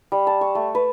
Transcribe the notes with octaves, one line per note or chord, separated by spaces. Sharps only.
G3
A5
C#6
A3
B4